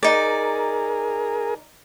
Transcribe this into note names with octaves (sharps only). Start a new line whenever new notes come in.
D#4 G#4 A#4 D5